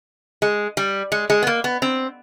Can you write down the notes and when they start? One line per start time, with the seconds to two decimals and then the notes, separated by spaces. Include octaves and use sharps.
0.42 G#3
0.77 G3
1.12 G#3
1.30 G#3
1.43 B3
1.47 A#3
1.64 B3
1.82 C4